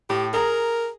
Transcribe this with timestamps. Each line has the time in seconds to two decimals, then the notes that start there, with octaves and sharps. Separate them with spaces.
0.10 A2 G4
0.34 G#4 A#4 A#5